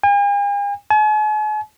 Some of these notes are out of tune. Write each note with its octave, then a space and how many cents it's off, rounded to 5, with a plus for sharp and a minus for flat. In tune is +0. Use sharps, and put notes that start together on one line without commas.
G#5 -45
G#5 +45